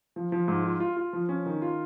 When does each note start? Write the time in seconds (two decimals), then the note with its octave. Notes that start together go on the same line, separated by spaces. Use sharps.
0.16 F3
0.32 F3
0.48 G#2
0.64 F4
0.80 F4
0.97 F4
1.13 F3
1.29 C#4
1.46 D#3
1.62 F4